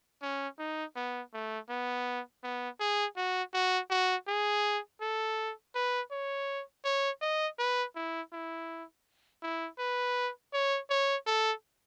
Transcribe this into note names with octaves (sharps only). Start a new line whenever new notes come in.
C#4
D#4
B3
A3
B3
B3
G#4
F#4
F#4
F#4
G#4
A4
B4
C#5
C#5
D#5
B4
E4
E4
E4
B4
C#5
C#5
A4